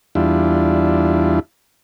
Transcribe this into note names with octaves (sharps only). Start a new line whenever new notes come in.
E2 G3 D4 E4 F4